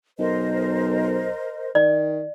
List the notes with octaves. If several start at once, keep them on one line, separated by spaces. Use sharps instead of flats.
B1 A#4 C5 D#5
D#3 D5